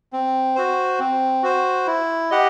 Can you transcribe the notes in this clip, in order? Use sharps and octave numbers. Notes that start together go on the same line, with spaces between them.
C4
F#4 C5
C4
F#4 C5
E4
G4 D#5 F#5